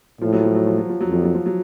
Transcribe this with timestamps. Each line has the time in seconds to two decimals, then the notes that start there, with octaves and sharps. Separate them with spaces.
0.21 A2 F3
0.33 F#3
0.44 F3
0.55 F#3
0.67 F3
0.78 F#3
0.89 F3
1.01 F2 F#3
1.12 F3
1.24 F#3
1.35 F3
1.46 F#3